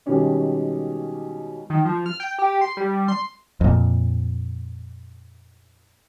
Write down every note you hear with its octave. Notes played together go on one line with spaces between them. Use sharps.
B2 D#3 G3 G#3 C#4 D4
D#3
F3
F6
G5
G4
C6
G3
C6
F2 A#2